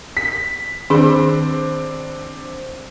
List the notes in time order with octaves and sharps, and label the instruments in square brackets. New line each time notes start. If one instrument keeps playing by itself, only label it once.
[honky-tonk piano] B6
[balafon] D#3 G#4 B5 [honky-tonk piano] C4 D4